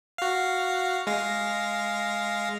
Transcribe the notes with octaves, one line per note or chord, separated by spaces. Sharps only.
F#4 F5
G#3 F5 A#6